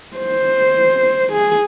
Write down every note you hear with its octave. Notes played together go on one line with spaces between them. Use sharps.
C5
G#4